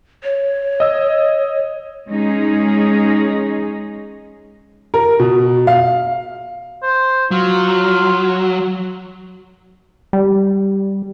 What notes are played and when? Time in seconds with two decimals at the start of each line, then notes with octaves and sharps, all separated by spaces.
0.24 C#5
0.80 D#5 E6
2.08 G#3 C#4 D#4 G#4
4.94 A#4
5.19 B2
5.67 F5
6.83 C5
7.31 F#3 F4
10.13 G3